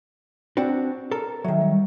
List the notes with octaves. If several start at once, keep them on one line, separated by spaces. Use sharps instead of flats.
C4 D4 F#4
A4 A#4
D#3 F#3 E5
G3